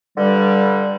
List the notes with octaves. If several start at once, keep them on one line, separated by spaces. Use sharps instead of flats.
G2 D3 G3